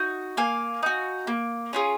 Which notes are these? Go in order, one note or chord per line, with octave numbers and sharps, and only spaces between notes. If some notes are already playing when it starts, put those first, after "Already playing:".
Already playing: D#4 F#4
A#3 F5 G#5
D#4 F#4
A#3
C#4 F4 G#4